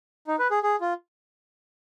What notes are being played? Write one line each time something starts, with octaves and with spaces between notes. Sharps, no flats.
D#4
B4
G#4
G#4
F4